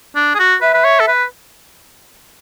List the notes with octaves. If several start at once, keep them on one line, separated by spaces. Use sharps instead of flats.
D4
G#4
F#4
B4 E5
B4
C#5
A4
B4